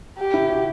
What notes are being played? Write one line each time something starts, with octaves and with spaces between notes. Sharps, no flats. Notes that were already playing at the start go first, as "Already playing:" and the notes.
G4
E4
F#4